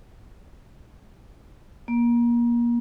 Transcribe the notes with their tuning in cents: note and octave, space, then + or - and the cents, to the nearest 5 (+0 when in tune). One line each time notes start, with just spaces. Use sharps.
A#3 +30